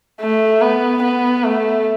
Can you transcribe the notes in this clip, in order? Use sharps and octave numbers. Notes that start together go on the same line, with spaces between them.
A3
B3
B3
A3